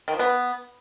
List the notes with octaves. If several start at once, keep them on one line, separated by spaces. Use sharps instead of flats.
D#3
F3
B3